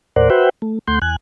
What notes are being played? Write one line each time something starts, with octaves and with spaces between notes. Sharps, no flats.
D#2 A2 A#4 C5 D5 F#5
F#4 B4 C5 E5 F#5 G5
A3
D2 A3 F#5 C6 G6
E2 G#5 F#6